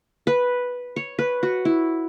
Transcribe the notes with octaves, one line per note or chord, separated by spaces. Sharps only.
B4
C#5
B4
F#4
E4